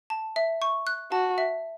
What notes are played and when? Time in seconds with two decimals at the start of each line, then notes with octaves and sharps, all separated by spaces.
0.10 A5
0.36 E5
0.62 C#6
0.87 F#6
1.12 F#4 A5
1.38 E5